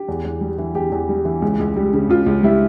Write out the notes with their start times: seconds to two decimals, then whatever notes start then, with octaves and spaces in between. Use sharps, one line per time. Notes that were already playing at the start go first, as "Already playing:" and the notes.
Already playing: G4
0.08 E2
0.24 E2
0.41 G3
0.58 E3
0.75 E2 G4
0.92 E2
1.09 G3
1.25 E3
1.42 C#2
1.59 C#2
1.76 G3
1.93 C#3
2.09 C#2 F4
2.26 C#2
2.43 G3 E4